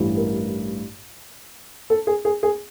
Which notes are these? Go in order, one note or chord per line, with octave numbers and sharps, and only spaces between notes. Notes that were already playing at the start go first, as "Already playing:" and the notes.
Already playing: A1 G2 E3
A#4
A4
G#4
G#4
G#4